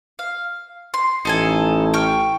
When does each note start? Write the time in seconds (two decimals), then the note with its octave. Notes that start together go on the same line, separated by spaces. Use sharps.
0.19 F5
0.94 C6
1.25 A1 D#4 A4 G#5
1.94 G5 C#6 F6